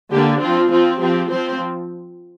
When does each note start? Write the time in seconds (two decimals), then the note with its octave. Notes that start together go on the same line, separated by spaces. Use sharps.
0.11 D3 A#3 D4 G4
0.41 F3 C4 F4
0.70 F3 C4 F4
1.00 F3 C4 G4
1.30 F3 C4 C5